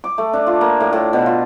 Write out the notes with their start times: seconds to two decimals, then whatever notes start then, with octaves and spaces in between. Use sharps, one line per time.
0.04 D6
0.18 A3
0.33 D4
0.47 F4
0.61 A#3
0.80 A2
0.93 A2
1.13 B2
1.26 F4